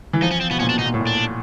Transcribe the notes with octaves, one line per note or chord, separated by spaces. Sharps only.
E3
F3 D#4
C#4
C4
B2 B3
A#2 C#4
B2
D4
B2 D#4
A#2
A2
A#2
D4